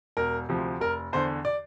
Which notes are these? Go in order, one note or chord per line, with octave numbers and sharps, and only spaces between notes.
E1 A#4
D2 C3 F3
F1 A#4
E2 D3 C5
D5